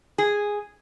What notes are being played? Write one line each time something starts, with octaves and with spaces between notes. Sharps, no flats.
G#4